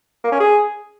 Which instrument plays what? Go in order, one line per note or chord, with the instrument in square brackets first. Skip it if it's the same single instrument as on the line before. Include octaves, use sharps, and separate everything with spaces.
[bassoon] A#3
C#4
G#4